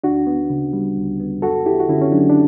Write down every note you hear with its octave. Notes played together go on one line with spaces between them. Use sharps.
D2 D4 F#4
B3
C#3
G3
D2
B3
F#2 F#4 A4
B3 E4 G4
F#4
D3 C#4 E4
C#4
F#3 D4
D4